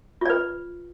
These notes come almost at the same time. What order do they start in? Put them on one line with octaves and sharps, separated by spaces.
F4 D5 B4